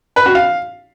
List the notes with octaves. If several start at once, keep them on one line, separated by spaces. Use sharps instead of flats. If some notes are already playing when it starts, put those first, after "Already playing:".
B4
F#4
F5